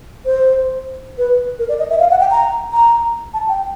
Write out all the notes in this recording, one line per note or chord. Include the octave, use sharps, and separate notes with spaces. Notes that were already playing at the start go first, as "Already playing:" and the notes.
C5
B4
A#4
D5
D#5
E5
F5
F#5
G5
A#5
A#5
A5
G5